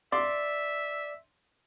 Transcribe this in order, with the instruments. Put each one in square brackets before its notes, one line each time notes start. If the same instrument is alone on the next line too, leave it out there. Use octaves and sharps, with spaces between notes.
[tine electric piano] D5 [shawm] E5 [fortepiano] C6 D6